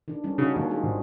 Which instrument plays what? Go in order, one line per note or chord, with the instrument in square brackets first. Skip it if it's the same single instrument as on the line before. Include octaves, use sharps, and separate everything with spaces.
[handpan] D#3 D4
D#3 G3 C#4
[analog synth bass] C#3 [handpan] D4 D#4 F#4
[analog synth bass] D#2 [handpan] G#3 A#4
[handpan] F4 G#4
[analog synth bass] G#1